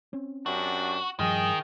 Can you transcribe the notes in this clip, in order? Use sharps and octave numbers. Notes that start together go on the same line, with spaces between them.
C4 C#4
F#2 D4 F#4 G4
G2 D#3 F3 G#4 D#5 G5